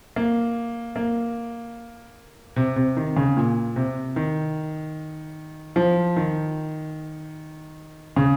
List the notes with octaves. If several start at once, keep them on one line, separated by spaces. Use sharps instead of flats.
A#3
A#3
C3
C3
D#3
C#3
A#2
C3
D#3
F3
D#3
C#3